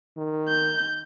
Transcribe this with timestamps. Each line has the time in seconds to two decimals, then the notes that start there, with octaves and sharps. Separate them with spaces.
0.17 D#3
0.49 G6